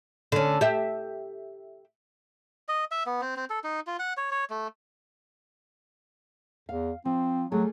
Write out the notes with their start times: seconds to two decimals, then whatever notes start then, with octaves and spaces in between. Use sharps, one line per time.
0.32 D3 C#4
0.61 G4 E5
2.68 D#5
2.91 E5
3.06 B3
3.21 C4
3.37 C4
3.50 A4
3.64 D#4
3.87 F4
3.99 F#5
4.17 C#5
4.31 C#5
4.50 A3
6.69 E2 F5
7.05 F3 C4
7.52 F#3 G3 A3 G#4